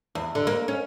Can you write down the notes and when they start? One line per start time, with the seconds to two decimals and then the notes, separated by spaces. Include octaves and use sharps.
0.15 E2
0.35 D3
0.47 A#3
0.68 C#4